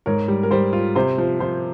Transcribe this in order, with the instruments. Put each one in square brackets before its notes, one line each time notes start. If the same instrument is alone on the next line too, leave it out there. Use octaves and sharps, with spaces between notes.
[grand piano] G#2 [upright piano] A#4 C#5
[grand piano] G3
[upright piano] A#4
[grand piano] G3 [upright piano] C5
[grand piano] F4
[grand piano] C3 [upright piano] C5
[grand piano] F3
[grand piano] F3 [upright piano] C5